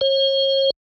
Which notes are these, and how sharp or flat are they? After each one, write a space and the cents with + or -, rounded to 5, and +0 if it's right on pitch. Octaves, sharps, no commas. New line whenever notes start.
C#5 -40